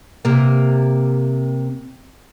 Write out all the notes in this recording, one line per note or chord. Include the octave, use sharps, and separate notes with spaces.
C3 A#3